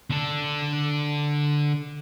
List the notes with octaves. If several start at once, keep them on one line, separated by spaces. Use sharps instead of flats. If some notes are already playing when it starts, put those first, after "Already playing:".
D3 A4